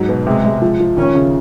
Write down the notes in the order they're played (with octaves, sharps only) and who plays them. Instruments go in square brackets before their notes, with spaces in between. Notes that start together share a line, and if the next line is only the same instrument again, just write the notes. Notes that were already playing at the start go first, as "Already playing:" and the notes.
Already playing: [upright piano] G#2 F#3
B2
[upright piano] C3 [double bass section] G#3
[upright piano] C3
F3
F3
[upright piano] D#2 [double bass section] C#4
[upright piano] C#3